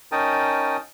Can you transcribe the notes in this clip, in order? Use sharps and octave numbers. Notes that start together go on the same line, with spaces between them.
C#4 D#4 A#4 G5 A5 D#6